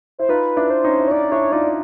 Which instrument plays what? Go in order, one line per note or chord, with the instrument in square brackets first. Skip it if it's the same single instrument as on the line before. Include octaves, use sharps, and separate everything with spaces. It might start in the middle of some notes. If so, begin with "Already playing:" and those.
[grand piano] E4 [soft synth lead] C5
[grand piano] D#4 F4 [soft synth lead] B4
[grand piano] D4 E4
[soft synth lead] C5
[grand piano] C#4 D#4
E4
[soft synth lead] C#5
[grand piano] C#4 D#4 [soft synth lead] D5
[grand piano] D4 E4 [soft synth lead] C#5
[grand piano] D#4 F4 [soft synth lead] D5